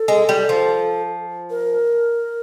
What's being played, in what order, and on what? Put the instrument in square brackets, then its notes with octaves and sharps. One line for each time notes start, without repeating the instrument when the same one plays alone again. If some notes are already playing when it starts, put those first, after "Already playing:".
Already playing: [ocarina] A4
[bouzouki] G#3
G3
F3
[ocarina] A#4